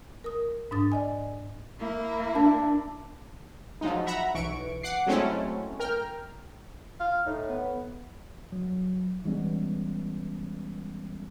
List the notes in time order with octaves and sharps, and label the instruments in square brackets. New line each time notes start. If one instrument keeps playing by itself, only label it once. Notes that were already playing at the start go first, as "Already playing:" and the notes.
[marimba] A#4 D#6
G#2 D4 D#6 A6
D5 D#5 G#5
[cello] A#3 E4
[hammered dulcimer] D4
[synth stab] F3 F#3 G#3 D#4
E5 F#5 A#5 B5
B1 E3 C#6 D7
F#5 D6 C7
F#3 G#3 A3 C4 C#4 E4
A#4 G5 F6
[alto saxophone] F5
[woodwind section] A2 [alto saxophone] D#4
[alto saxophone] B3
[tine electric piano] F#3
E3 G3 G#3 B3 C#4